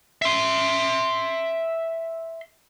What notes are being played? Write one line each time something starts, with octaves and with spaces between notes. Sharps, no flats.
E5 C6